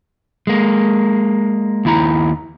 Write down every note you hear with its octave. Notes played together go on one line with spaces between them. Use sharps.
G#3 A#3
D#2 E4 A#5